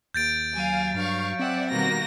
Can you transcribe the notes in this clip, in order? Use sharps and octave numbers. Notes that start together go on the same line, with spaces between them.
D#2 G6 A6 D7
F#3 F5 G#5
G2 F5 C#6
C4 D5 E5 F#5
B2 D#3 G3 A#3 F#4 A#6